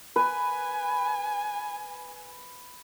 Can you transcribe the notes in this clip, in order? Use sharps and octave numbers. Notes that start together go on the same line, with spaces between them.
B4 G#5